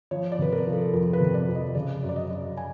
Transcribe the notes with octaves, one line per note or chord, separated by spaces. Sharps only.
F3 C#5
D5
C3 B4
A#4
F3
A4
F2 A#4
B4
C3
D5
F2
D#5
C#3 D5
F#2
D5
D#5
F#2
G#5